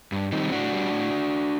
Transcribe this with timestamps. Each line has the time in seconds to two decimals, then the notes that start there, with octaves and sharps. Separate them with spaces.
0.12 G2
0.32 D#3 G3 C4 D#4
0.52 A2 D4 F#4
0.72 G3
0.92 A2